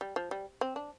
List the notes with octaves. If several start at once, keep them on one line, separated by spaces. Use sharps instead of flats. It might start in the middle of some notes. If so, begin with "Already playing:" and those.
G3
F3
G3
C4
D4